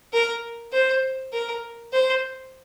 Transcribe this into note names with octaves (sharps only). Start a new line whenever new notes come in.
A#4
C5
A#4
C5